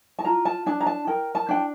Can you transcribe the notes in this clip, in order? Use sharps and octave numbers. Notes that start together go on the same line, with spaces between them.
A5
F4 A#5
A5
D4 A5
A#5
A5
A#4 G5
A5
D4 G5